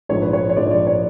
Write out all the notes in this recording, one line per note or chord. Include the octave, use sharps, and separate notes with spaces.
A#1 G#2 F3 C#5
B4
C#5
C#5
A#1 G#2 F3 D5
D5
C#5